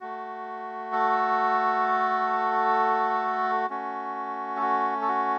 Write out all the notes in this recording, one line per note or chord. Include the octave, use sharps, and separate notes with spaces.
A3 F#4
A4
A3 C#4 F#4
A4
F#4
A4
F#4